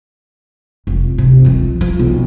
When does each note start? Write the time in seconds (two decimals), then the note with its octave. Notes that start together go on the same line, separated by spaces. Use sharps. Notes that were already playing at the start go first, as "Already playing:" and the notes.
0.87 F1
1.18 C3
1.45 D#3 F3
1.81 F3
1.99 B1